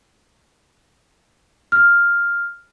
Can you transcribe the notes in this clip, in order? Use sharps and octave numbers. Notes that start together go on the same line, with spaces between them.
F6